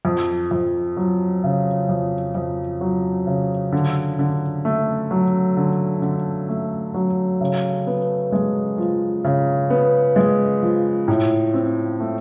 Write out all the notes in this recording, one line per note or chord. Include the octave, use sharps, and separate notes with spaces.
F2
F2
F#3
C#3
F2
F2
F#3
C#3
D3
D3
A3
F#3
D3
D3
A3
F#3
C#3
B3
G#3
F3
C#3
B3
G#3
F3
A2
C4
A3